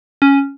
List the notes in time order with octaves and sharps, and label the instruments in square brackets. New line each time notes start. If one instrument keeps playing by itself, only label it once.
[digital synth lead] C#4